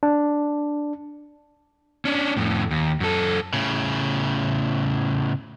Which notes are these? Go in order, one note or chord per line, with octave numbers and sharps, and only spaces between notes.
D4
C#4 D4
F2 A2
D#2
F#2 A4
A2 C#3